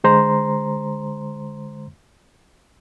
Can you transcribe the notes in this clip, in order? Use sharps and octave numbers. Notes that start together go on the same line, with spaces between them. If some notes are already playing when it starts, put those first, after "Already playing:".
D3 G#3 C5 A#5 C6